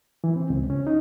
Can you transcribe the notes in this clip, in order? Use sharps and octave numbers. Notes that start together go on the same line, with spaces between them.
E3
C4
C#2
C#4
D#4